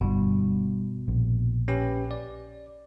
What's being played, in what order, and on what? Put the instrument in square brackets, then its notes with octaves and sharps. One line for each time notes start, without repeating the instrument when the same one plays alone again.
[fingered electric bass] G1 G2 [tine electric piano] B2
[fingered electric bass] A#1
[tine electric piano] C#4 G4 B4
D5